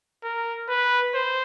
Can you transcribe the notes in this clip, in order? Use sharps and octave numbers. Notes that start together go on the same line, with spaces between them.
A#4
B4
C5